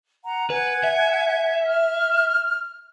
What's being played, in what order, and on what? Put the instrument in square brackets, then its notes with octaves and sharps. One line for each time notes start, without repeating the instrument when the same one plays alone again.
[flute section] F#5 A#5
[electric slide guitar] B4 [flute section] F#5 G#5 G#6
[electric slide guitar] E5
[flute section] F6